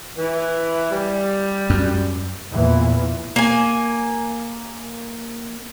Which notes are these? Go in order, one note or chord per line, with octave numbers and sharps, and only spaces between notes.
E3
G3
F#2
E2 A#2 E3
A#3 G#5